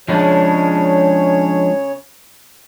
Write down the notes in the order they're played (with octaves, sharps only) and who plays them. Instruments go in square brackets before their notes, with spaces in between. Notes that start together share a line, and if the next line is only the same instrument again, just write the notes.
[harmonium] C#3 C#5 [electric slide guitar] F3 G#3 D4